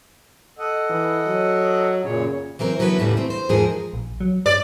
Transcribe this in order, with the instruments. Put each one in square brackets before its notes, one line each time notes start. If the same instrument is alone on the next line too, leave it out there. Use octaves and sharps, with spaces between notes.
[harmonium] A4 D#5 F#5
[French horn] E3
F#3
[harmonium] F#2 A#2 C#5 [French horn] C#3
[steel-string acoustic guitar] E3 F#3 C4 A#4
D3 F#3 B3 E4 B4
E2 A2 C#3 G3
A3 C4
C5
E2 G#2 F3 G#4 A#4
[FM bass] A#1
F#3
[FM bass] G2 [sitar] D5